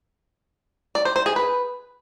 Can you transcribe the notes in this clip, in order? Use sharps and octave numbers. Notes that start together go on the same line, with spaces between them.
D5
C5
C5
G#4
B4